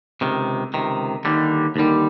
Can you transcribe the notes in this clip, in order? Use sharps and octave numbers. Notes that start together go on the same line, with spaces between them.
C#2 C3 D#3
C#2 C3 D#3
D#2 D3 D#3 G3
D#2 D3 D#3 G3